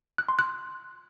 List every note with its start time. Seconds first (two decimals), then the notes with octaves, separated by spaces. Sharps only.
0.18 F#6
0.29 C6
0.39 F#6